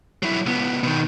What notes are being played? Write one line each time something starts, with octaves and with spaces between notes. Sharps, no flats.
F#3 E4
C#2 B3
B2 D#3